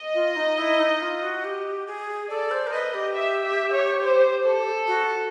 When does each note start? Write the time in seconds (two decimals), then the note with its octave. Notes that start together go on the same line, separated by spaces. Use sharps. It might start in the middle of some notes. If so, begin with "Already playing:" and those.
Already playing: D#5
0.14 F4
0.36 D#4
0.58 E4
0.80 D#4
1.00 F4
1.23 F#4
1.44 G4
1.87 G#4
2.29 A4 D5
2.51 C5
2.67 A#4
2.72 B4 D#5
2.94 G4
3.15 E5
3.45 E5
3.73 C#5
4.02 C5
4.45 A4
4.88 F#4